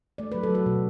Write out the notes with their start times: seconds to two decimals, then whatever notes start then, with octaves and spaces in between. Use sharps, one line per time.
0.18 A3 D5
0.32 F#3 B4
0.43 A4
0.50 F#3 F#4 B4
0.66 B2